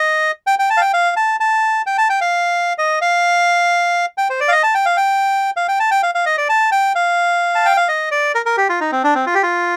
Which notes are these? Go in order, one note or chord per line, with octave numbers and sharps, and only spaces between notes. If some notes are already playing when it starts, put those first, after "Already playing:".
Already playing: D#5
G5
G5
A5
F5
G5
F5
A5
A5
G5
A5
G5
F5
D#5
F5
G5
C5
D5
F5
D#5
A5
G5
F5
G5
F5
G5
A5
G5
F5
F5
D#5
D5
A5
G5
F5
A5
G5
F5
D#5
D5
A#4
A#4
G4
F4
D#4
C4
D4
C4
F4
G4
F4